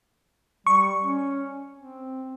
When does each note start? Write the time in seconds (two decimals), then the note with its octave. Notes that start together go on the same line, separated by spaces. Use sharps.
0.67 G3 C#6
1.04 C#4
1.77 C4